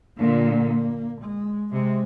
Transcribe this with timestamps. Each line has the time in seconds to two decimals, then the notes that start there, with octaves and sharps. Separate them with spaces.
0.19 A#2 D3 A#3
1.21 G#3
1.73 C3 G#3